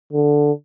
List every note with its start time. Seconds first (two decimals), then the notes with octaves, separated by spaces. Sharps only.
0.13 D3